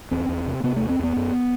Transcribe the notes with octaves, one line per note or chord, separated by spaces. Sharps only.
E2 C4
E2
C3
C3 B3
E2 A3
C4
E2 B3
F#2